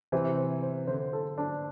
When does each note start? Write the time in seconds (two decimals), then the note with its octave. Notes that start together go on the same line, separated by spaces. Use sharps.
0.12 C3 E3 C5
0.37 C5
0.62 C5
0.87 D3 C5
1.13 A4
1.38 D4